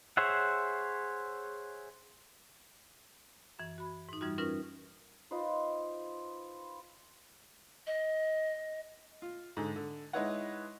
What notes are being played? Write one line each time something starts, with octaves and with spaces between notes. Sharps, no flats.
G#4 C5 C#5 E5 F#5
F#2 E3
F#4 B5
G#2 D#4
F#2 E3 G3 D#4 F4 F#4
C#4 D#4 F4 A#4 B4
D#4 F4 B4 C5
D#5
F4
G#2 D3
D3
G#3 D#4 E4 B4 C#5 F#5